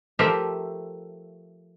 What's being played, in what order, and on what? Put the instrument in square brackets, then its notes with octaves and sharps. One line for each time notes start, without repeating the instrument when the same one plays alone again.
[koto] F3 A3 G4 A#4 C5 E5